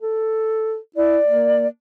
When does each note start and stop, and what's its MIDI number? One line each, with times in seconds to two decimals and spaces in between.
0.01 0.77 69
0.96 1.18 64
0.96 1.66 74
1.27 1.67 58